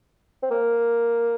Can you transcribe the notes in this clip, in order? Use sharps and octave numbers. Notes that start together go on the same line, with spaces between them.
C4
A#3